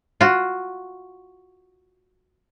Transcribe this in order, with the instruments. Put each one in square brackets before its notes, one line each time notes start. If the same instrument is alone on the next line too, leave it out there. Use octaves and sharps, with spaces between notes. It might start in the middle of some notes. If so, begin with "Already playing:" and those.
[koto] F4 F#4